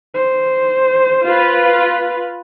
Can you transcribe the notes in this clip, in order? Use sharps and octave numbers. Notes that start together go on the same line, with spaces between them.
C5
F4 B4